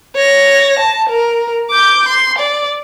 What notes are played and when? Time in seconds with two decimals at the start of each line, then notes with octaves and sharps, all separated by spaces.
0.15 C#5 A#6
0.79 A5
1.09 A#4
1.70 D6 G6
2.09 C6
2.39 D5